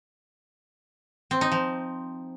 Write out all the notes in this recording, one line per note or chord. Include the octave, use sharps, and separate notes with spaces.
C4
D#4
F3